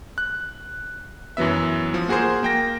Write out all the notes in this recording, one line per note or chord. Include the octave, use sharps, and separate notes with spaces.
F#6
F#2 E3 F#3 B3 E5
F3
A#3 F#4 G#4 A#4 C5
A#3 G5 A#6